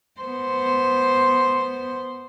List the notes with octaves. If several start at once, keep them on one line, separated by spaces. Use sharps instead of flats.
B3 C5